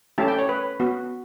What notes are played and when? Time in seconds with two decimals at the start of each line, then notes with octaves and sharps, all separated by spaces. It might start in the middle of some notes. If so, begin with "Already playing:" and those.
0.18 A3 C#4 E4 G4 A5
0.28 G5
0.38 C#5
0.49 B4
0.80 B3 F#4